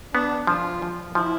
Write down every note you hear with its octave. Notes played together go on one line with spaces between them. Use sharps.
B3 D4
F3 D4 F4
F3
F3 E4